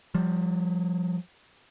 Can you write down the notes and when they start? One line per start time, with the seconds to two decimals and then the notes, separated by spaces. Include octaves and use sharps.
0.15 F3 G3